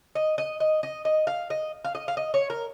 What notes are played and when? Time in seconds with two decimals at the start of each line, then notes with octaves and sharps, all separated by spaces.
0.15 D#5
0.38 D#5
0.60 D#5
0.83 D#5
1.05 D#5
1.27 F5
1.50 D#5
1.85 F5
1.95 D#5
2.08 F5
2.17 D#5
2.34 C#5
2.50 A#4